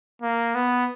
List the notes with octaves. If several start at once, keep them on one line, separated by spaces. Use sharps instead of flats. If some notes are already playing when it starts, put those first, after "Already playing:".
A#3
B3